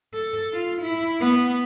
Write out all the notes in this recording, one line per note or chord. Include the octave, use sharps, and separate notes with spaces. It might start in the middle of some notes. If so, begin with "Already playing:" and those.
A4
F4
E4
B3